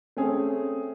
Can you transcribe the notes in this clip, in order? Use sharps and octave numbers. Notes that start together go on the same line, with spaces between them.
A3 C4 C#4 G#4